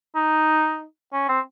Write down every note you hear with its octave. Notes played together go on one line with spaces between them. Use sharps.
D#4
C#4
C4